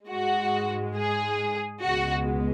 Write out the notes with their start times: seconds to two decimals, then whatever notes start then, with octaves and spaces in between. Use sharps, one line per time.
0.10 G#2 G#3 F#4
0.96 G#4
1.82 C#2 B2 G#3 F#4